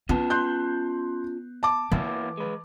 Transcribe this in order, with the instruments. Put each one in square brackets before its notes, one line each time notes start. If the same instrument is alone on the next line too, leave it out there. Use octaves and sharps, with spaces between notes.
[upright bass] B3 [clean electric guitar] C#4 F4 A5
[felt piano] C6 F#6 G6
A5 D6
[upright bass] E3 [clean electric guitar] A#3 B3 E4
[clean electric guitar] G#3 B4